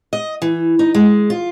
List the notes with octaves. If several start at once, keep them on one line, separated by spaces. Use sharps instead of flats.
D#5
E3
D#4
G#3
F4